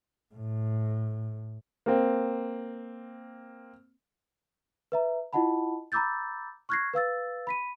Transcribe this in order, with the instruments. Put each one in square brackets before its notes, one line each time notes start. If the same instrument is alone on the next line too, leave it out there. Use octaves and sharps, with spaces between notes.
[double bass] A2
[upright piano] A#3 C4
[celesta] B4 E5 A#5
E4 F4 D#5 F#5 A5 B5
A#5 B5 D6 E6 G6 A6
C#6 F6 F#6 G#6 A#6 C7
B4 F5 E6 A6
B5 B6 D#7